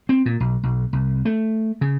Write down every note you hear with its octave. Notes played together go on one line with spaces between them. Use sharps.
C4
A#2
B1
B1
C2
A3
C#3